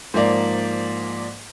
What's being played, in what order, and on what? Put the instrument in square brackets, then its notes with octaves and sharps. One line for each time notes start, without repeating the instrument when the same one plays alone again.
[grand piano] G#2 F3 A#3 D5